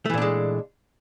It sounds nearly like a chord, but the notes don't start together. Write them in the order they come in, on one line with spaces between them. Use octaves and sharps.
A3 E3 A#2 D4 G#3